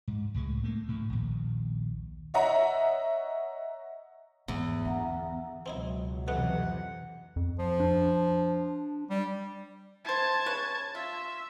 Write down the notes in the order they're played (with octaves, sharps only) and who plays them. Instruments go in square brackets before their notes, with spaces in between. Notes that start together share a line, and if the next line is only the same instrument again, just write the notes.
[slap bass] G#2
C#2 A2 G#3
A3 A#3
D2 A2
A#1 D#2
[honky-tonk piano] C#5 D#5 E5 F#5 A#5
[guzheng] E2 [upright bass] G#2
[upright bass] D3 [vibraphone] E5 F#5 A#5
[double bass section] C#2 B2 F#3 [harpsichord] C4 D#4 E4
[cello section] F2 C3 E3 [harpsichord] A3 B3 D#4 [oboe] F#5
[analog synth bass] F2
[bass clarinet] F3
[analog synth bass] D4
[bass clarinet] G3
[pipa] E4 C5 [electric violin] A5 G#6
[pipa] C#3 B4 C#5
[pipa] F4 [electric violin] E5